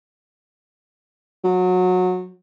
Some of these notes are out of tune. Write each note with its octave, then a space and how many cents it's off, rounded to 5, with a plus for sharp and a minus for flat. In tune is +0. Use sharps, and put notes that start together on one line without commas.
F#3 -20